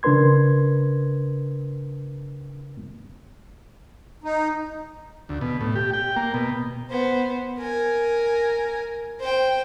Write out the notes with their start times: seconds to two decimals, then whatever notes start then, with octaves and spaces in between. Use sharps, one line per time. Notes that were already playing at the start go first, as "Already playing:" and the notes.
0.03 C#3 D4 A#4 B4 C6 G#6
4.24 D#4
5.29 D2
5.41 B2
5.61 A2
5.76 G4
5.93 G5
6.16 A#3
6.34 B2
6.90 B3 C5
7.58 A#4 G#5
9.20 C5 G5